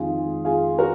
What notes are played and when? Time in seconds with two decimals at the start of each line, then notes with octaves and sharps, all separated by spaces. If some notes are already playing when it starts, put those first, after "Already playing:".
Already playing: F2 D#3 G#3 D#4 F4 G#4
0.45 F4 G#4
0.79 F#4 A#4